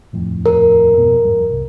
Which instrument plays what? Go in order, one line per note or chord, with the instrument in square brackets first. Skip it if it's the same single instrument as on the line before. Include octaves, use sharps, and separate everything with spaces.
[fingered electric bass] D#1 F2 A2
[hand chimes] A#4
[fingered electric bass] F2 G#2 B2
F2 G#2 G3
C2